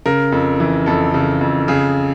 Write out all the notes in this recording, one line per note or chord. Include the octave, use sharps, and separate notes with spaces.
C#3 A#4
F2
E3
F2 A4
C#3
F2
C#3 G#4